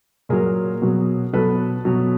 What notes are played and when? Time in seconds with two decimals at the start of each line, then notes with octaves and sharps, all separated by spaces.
0.29 A#2 F#3 G#4 A#4
0.82 B2 F#3
1.33 B2 F#3 A4 B4
1.85 B2 F#3